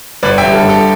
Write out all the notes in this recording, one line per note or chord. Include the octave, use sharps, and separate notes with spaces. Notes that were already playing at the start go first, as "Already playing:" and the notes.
G1 B4 D5
E5 G5
G2
A4
G1
A4